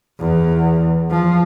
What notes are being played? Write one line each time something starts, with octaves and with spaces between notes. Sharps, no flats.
E2
F3